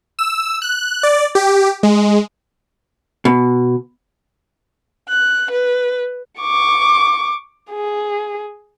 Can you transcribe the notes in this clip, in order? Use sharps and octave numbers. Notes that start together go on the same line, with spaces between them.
E6
F#6
D5
G4
G#3
B2
F#6
B4
C#6 D6
G#4